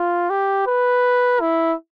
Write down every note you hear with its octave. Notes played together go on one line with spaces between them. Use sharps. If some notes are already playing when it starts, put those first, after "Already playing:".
Already playing: F4
G4
B4
E4